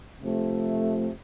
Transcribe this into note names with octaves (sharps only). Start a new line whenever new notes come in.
C3 F3 A3